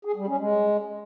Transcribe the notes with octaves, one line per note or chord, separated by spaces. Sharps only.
G#4
G3
C#4
G#3